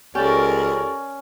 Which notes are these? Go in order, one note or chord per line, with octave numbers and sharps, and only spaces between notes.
C#2 C#4 G4 A4 A#4 D5